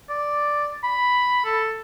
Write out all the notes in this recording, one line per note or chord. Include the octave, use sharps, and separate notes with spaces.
D5
B5
A4